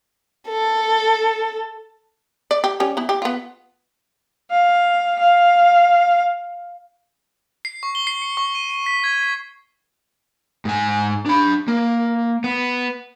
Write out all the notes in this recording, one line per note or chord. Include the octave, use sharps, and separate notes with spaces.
A4
D5
G4
G3 C#4 G4
B3 E4
G4
B3 F4
F5
F5
C7
C#6
G7
C7
C#7
C#6
D#7
D#7
B6
G#6
B6
G#2 G#5
D4 B5
A#3
B3